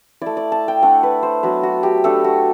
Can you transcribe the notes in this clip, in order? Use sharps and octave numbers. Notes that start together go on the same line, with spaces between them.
A3 E4 D5
D5
A5
G5
A3 D4 F#5
B4
C5
F#3 B3 D4 B4
F#4
G4
A3 D4 A4
F#4